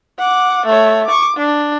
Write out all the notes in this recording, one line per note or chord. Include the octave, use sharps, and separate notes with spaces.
F#5 D6
A3 C#5
C#6 D6
D4